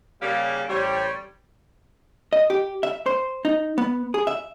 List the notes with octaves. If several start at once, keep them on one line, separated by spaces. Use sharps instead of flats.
C#3 G3 A#3
A1 G3 C5 C#5
D#5
G4
E5
C5
D#4
B3
G#4
E5